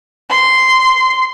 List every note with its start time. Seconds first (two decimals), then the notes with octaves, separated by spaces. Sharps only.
0.29 C6